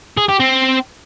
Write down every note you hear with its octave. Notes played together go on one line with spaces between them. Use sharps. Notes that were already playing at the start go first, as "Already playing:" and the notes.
G#4
G4
C4